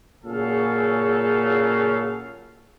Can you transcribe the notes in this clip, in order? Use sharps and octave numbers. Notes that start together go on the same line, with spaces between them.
A#2 C#3 F#3 G#4 A4 F5